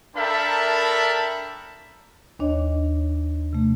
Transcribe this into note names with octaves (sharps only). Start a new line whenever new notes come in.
D4 A4 A#4 E5 G5 B5
D#2 D4 C#5 D#5
C3 A3